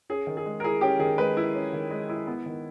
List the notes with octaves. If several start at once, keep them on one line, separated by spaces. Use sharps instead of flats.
C#4 G#4
D#3
G#4
G#3
A#4
E4 G#4
C#4 G4
D#3 G#4
G#3 B4
E4
C#4
D#3
G#3
E4
B3
D#3